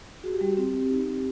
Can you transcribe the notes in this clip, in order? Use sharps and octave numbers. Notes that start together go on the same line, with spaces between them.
F#4 G#4
G4
G3 F#4
C4 G4
C4
D#4
C4